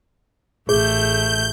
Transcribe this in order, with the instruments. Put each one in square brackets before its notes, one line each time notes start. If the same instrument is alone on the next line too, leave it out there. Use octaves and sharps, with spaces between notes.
[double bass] A1 [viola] A3 [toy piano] G#4 [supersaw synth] G6